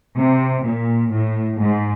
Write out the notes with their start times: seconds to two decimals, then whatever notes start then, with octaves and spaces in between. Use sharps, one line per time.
0.16 C3
0.64 A#2
1.11 A2
1.58 G#2